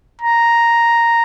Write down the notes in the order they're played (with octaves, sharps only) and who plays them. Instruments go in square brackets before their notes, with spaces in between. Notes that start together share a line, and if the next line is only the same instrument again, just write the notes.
[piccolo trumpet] A#5